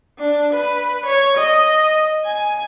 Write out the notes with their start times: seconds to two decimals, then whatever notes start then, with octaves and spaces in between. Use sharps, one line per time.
0.19 D4
0.53 B4
1.06 C#5
1.38 D#5
2.26 G#5